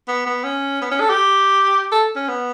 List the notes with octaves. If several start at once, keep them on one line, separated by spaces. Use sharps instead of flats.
B3
B3
C#4
B3
C#4
A4
G4
A4
C#4
B3